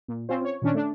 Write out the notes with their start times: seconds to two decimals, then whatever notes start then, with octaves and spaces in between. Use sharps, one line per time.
0.08 A#2
0.29 C4 C#4 F4 C5
0.45 C#5
0.62 A#2 D#3 C#4 D4
0.74 A3 D4